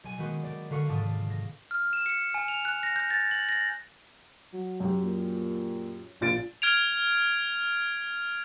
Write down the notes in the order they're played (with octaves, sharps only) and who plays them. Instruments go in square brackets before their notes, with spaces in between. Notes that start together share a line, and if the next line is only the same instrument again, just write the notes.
[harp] B1 G#5
D#3 G#3 A#3 B3 D#4 F#4
D#3 D5
D3 F#4 B4 F5 C#6 C#7
F1 G#2 D4 A5 D#6
A#6
[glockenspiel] F6
E7
C#7
G#5
F7
F#6
A#6
G6
A6
F#7
A#6
[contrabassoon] F#3
[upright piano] F#2 G4
[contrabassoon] A#2
[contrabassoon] A#1 [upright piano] A#2 A6 D7
[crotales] F6 G#6 D7 F7